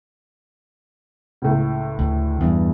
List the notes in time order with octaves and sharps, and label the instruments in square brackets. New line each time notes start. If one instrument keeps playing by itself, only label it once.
[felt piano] C#2 A2
[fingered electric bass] D2
E2 G2